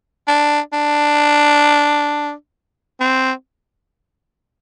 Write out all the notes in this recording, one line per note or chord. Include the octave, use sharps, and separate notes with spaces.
D4
D4
C4